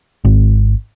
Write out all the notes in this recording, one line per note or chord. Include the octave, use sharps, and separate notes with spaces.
G#1